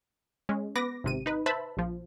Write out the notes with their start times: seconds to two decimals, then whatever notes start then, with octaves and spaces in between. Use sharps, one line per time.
0.49 G#3 C#4
0.76 B3 B4 D6 A#6
1.04 G#1 C3 D#7
1.26 D#4 B4
1.46 B4 C5 E5 A5 B5
1.77 A#1 F3